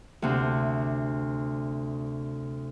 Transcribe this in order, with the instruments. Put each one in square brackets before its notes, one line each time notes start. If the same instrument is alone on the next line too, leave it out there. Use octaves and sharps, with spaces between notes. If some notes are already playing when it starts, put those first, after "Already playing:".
[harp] D2 C3